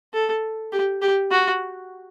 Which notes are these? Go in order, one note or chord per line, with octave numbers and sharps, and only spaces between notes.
A4
G4
G4
F#4